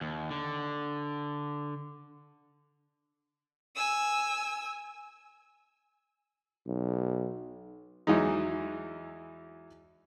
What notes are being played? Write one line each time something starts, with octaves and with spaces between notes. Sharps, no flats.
D#2
D3
G#5 E6
B1
E2 E3 F#3 G#3 D#4